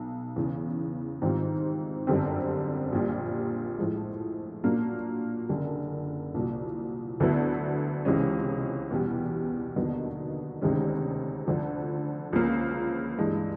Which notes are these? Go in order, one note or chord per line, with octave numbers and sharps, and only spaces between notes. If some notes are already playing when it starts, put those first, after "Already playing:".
Already playing: B1 B2
E2 C#3 E3
G#2 D#3 G3 C4 F4
G1 F#2 D3 G3 C4
A#1 A#2 G3
A2 F3 G#3
A#2 F#3 A#3 D4 F4
F#1 F#2 D3
C2 A#2 F#3
D2 D3 F#3 B3 E4
C#2 C3 E3 G#3 C#4
E2 B2 G3
D#2 D3 F#3 B3 D#4
D2 C3 D#3 G#3 C#4
D2 D3 F3
C#2 C#3 F3 A#3 C#4
G2 E3 G#3